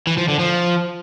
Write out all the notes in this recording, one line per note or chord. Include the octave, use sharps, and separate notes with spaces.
E3
F3
D3
F3